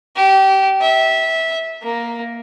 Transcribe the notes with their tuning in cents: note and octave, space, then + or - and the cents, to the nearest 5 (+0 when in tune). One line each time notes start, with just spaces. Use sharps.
G4 -25
E5 -20
A#3 +5